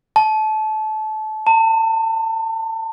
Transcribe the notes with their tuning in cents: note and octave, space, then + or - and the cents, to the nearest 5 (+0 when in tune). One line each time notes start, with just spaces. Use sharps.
A5 -25
A5 +35